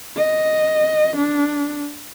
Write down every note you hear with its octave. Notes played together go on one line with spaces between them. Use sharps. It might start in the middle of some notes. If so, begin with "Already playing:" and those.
D#5
D4